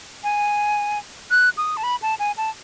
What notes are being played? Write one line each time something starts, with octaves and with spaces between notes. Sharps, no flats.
G#5
F#6
D#6
A5
B5
A5
G#5
A5